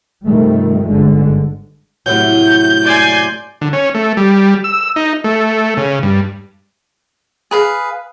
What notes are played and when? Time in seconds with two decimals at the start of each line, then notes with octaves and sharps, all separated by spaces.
0.27 G2 C3 D#3 F3 G3 A3
0.88 G1 G#2 D3 G#3
2.06 A2 C3 F#3 G6
2.85 D5 G#5 C6
3.61 D3
3.73 C#4
3.94 A3
4.17 G3
4.64 E6
4.96 D#4
5.24 A3
5.77 C#3
6.03 G2
7.51 G#4 B4 F5